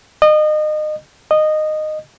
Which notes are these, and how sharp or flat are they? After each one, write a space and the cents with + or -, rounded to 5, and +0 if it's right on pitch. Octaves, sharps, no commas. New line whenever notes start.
D#5 -30
D#5 -15